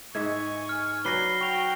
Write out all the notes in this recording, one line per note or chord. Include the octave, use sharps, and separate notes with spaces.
G#2 D#5 E5 G#5 C#6 G#6
F6
F#3 B4 D5 A#6 C7 G7
F#4 G5 C#6 F7